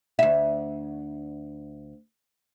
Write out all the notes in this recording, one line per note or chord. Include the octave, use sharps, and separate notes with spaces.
D2 E5